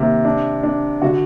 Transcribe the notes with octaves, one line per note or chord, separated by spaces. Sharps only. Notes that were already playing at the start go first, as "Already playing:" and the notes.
Already playing: C3 D#3 A#3
D4
D4
D3 F#4